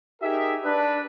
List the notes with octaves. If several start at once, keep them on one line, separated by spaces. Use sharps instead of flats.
D#4 G4 G#4 A#4 E5
D4 B4